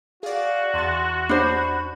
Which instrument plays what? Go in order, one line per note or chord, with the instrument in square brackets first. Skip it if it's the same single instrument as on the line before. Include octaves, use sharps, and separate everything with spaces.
[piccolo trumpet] F#4 [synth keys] G#4 D5 [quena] F5
[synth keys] E2 A6 [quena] C6
[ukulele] D4 C5 [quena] B5